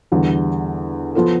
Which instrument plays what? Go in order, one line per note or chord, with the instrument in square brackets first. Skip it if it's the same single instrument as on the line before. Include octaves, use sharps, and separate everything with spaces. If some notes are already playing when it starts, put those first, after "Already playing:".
[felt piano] E2 D3 G3
F3 B3 F4 A4